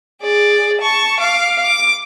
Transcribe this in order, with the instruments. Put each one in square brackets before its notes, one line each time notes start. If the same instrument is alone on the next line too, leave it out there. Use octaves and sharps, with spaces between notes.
[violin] G#4 D5
A5 C#6
F5 D6
D6